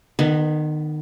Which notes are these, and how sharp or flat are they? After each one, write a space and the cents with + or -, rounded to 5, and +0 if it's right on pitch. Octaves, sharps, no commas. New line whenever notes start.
D#3 -30 B3 +0